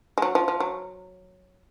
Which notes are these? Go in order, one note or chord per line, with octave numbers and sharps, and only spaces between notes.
G#3
F#3
F3
F3
F#3